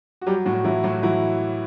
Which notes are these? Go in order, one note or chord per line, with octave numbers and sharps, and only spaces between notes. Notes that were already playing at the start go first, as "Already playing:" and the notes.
F#4
F#3 G3 G4
A2 F#3 F#4
E3 F#3 E4
A2 F#3 F#4
E3 F#3 E4